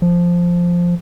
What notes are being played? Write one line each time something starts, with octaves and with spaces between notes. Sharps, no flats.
F3